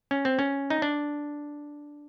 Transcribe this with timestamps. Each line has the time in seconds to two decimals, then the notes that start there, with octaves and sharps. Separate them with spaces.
0.11 C#4
0.25 C4
0.39 C#4
0.70 D#4
0.82 D4